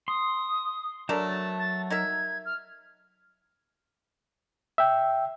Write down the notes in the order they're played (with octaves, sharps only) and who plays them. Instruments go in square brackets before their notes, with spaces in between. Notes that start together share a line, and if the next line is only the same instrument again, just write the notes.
[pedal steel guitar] C6 [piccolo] D#6
[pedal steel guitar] F#3 A5 [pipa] A3 D4 A#4
[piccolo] A6
A6
[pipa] D#4 A#4 E5 [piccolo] G#6
[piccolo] F6
[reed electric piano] E5 G5